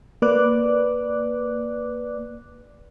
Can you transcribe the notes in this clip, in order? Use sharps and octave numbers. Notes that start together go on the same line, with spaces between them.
A#3 B4 D5 D6 F#6